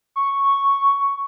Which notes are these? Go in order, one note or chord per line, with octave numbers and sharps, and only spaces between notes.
C#6